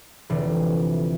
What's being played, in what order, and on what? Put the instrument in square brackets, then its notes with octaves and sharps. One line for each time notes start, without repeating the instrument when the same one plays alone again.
[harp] F1 D3 E3